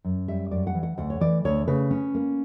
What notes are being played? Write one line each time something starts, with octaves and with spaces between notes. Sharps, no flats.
F#2
G3 E5
F#2 D5
F#5
E3
F#5
D2 F#5
C#5
E3 D5
D2 C#5
C#3 B4
C#4
A#3